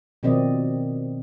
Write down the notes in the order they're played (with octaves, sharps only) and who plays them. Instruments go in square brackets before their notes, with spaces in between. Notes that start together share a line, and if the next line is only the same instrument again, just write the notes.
[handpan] B2 D#3 F3 C4 D5 D#5